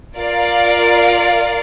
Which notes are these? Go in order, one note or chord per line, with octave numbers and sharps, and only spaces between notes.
F4 A#4 D5 F5